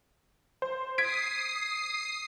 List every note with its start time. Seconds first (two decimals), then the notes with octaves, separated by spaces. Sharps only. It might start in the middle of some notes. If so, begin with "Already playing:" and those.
0.62 C5
0.98 D#6 G#6 B6 C7 D7